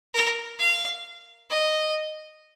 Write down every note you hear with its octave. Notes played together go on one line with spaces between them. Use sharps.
A#4
F5
D#5